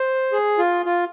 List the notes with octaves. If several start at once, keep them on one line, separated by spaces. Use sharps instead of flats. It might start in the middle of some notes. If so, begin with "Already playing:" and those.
Already playing: C5
G#4
F4
F4